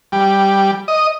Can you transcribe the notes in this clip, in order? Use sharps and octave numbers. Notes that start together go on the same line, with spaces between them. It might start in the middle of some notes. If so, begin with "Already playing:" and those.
G3
D#5